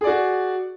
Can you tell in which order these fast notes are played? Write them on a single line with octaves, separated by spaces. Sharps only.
G#4 D5 F#4